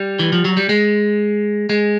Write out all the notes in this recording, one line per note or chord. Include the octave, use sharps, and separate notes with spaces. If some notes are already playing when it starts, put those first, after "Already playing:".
Already playing: G3
E3
F3
F#3
G3
G#3
G#3